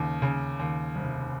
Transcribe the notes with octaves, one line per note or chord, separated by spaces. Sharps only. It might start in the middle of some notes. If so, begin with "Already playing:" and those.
Already playing: D#2 C#3
C#3
D#2
F1